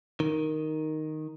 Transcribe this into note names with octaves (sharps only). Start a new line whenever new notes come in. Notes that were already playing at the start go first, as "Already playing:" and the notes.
D#3